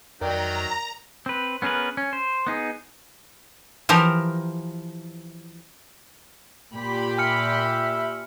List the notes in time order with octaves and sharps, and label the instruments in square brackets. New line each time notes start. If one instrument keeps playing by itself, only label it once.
[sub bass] F2 [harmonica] D#3 F#3 [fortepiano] A#4 D5 G5 [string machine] A#5
[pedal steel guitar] C4 B4
B3 C#4 G#4 A#4 B4
C#4
C5
B3 D#4 G#4
[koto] E3 F3 G4 A#4
[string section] A#2 G4 B5
[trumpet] E5 [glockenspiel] G#5 F6 C#7